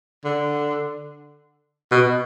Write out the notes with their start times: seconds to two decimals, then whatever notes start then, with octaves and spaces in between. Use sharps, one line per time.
0.25 D3
1.91 B2